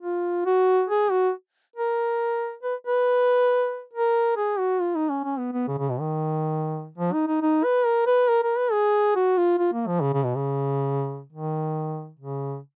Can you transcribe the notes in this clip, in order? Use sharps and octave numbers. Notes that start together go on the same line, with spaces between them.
F4
F#4
G#4
F#4
A#4
B4
B4
A#4
G#4
F#4
F4
D#4
C#4
C#4
B3
B3
C#3
C#3
B2
D#3
F3
D#4
D#4
D#4
B4
A#4
B4
A#4
A#4
B4
G#4
F#4
F4
F4
A#3
F3
C#3
C#3
B2
C#3
D#3
C#3